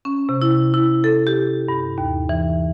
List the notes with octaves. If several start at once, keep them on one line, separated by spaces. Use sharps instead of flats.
C#4
C3
E4
E4
A4
G4
G2
D#2
E3